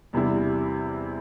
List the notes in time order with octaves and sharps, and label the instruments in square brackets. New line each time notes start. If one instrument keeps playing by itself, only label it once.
[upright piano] E2 C3 G3 E4